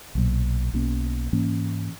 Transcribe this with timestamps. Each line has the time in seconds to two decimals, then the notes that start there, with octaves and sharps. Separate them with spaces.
0.15 B1 A#2 F#3
0.74 B1 B2 A#3 C#4
1.33 G#2 E3 A#3 C#4